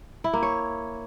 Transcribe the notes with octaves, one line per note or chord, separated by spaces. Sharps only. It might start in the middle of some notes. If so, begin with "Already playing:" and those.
E4
A#3
C#5